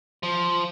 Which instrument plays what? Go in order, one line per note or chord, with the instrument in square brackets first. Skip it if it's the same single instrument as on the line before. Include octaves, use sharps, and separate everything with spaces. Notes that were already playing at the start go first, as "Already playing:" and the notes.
[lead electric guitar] F3